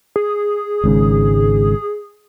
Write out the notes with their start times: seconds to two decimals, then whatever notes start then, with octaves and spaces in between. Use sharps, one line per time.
0.16 G#4
0.84 G#1 G#2 C#3